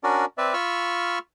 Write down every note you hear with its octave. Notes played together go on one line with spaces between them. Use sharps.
C#4 D4 F#4 A#4 D5
C4 B4 D5 E5
F4 B5 C#6 E6 F6